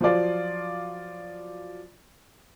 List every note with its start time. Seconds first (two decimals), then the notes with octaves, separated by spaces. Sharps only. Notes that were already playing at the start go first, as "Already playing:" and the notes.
0.01 F3 F#3 F4 D5